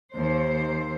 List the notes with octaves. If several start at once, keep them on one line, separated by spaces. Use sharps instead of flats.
D#2 C5